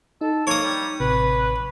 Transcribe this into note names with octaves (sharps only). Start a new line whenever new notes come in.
D#4 A4
A#3 C#5 D#6
G3
A1 C3 B4